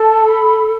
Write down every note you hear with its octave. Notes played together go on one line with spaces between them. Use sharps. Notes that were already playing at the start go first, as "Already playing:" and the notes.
Already playing: A4 A5
B5